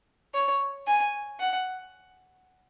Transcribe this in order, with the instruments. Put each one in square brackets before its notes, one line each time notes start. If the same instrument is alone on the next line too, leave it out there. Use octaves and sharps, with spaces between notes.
[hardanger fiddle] C#5
G#5
F#5